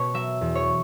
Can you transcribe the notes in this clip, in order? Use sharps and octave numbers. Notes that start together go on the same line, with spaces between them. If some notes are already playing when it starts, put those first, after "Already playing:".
Already playing: B2 B4 C#5
F#3 E5
E2
C#5